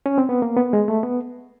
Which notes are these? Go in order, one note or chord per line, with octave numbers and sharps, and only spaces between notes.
C#4
C4
B3
A#3
B3
G#3
A3
B3